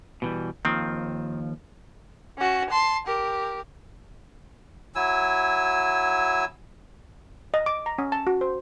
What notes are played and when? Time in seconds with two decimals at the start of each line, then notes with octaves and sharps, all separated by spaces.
0.22 B2 E3 G3
0.65 D#2 D#3 F3 C4
2.38 C#4 F#4
2.69 A5 C6
3.06 G4 A#4
4.95 F#3 E4 G#5 E6
7.54 D#5
7.66 D6
7.86 A#5
7.98 C#4
8.12 A5
8.27 F#4
8.41 C5